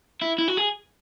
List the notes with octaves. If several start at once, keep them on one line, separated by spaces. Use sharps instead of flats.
E4
E4
F#4
G#4